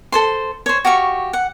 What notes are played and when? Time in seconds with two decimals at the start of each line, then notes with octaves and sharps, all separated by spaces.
0.12 A4 C5 C6
0.66 C5 C#5
0.85 F#4 G4 F5 C#6
1.33 F#5